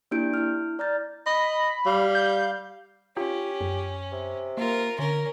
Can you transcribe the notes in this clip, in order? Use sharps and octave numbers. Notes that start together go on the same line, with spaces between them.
A#3 D4 E4 G4 G6 D7
E4 F6
D5 A#5 F6 G6 A6
D#5 B5
G3 F5
G6
C#4 F4 G4
F#2
C3
A#3 F4 A#4
D3 C#4 A#4